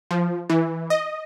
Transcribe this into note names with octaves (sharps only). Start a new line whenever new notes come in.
F3
E3
D#5